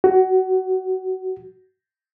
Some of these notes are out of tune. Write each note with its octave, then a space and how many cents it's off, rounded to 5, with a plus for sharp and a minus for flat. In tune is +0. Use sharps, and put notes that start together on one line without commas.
F#4 +20